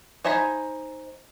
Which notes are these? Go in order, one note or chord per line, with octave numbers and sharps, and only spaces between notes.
D#4 C5 G#5 A#5 B5